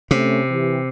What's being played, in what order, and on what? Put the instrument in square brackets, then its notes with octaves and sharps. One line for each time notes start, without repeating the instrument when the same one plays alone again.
[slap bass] C3 [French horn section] A3 C#4
[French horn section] E3 G4